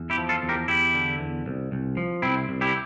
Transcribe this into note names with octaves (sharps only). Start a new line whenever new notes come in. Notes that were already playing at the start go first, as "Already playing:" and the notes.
Already playing: E2
E4 G4
F3
F4 A4
E2
G4 A#4
E2 E4 G4
D3
E2
C2
C2
F3
C2 C4 E4
C2
E4 G4